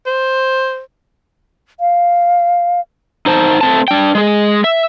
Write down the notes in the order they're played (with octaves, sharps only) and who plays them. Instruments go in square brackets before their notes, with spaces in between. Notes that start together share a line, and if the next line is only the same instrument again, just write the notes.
[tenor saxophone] C5
[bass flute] F5
[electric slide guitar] D#4 C5 A5
A3 C4 A5
D4 G5
G#3 G#4
E5